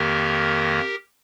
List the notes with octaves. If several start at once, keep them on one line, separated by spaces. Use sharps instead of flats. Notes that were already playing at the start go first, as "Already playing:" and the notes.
Already playing: F2 D#3 A#3 G4 A#4